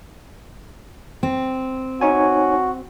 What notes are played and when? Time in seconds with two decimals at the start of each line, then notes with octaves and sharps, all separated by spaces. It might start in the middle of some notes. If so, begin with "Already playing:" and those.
1.23 C4
2.01 D#4 F#4 C#5 G#5